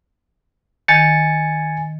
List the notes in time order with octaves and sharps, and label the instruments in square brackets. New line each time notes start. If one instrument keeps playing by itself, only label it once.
[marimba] D#3 [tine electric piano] G#5 A6 C#7